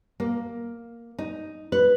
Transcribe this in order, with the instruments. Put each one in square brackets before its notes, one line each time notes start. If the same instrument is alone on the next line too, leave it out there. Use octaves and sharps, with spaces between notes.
[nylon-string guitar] A#3
D#4
B4